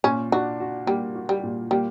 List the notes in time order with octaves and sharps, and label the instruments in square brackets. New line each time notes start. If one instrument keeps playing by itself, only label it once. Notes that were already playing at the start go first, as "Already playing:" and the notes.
[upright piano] A#2 [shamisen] C#4
[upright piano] D4 [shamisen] F#4
[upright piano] F#4
[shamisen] G3 [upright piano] A#3
[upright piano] F#4
[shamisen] G3
[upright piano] A#2
[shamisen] G3 [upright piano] A#3